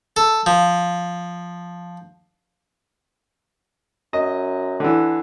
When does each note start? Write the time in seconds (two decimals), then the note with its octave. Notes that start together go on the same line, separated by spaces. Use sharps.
0.16 A4
0.46 F3
4.13 F#2 D#5
4.80 D3 E3